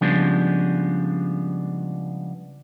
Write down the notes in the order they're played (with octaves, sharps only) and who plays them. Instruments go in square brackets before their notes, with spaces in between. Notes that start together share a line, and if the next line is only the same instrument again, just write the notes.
[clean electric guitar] C#3 F3 G3 G#3 B3 D4